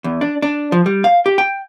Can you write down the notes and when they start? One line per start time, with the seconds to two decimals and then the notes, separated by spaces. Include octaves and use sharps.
0.04 E2
0.21 D4
0.42 D4
0.72 F3
0.86 G3
1.04 F5
1.26 G4
1.38 G5